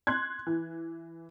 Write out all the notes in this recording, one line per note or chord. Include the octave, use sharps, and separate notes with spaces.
C6 F#6 G#6
E3